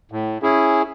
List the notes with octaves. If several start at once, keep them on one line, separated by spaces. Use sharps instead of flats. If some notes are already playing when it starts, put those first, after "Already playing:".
A2
C#4 E4 G#4